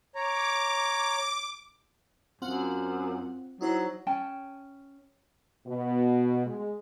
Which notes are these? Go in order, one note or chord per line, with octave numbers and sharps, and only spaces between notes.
C#5 A#5 D6
F#2 C4 F4 F#5
F#3 D#4 E4 C5
C#4 G5 A5
B2
G#3